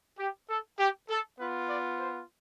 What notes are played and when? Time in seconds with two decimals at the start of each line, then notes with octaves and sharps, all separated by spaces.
0.19 G4
0.49 A4
0.79 G4
1.10 A4
1.38 B3 F4 B4
1.69 D5
2.00 C5